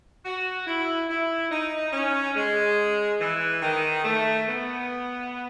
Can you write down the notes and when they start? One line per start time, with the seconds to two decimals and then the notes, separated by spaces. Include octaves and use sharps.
0.25 F#4
0.66 E4
1.09 E4
1.51 D#4
1.93 C#4
2.35 G#3
3.20 E3
3.62 D#3
4.04 A3
4.47 B3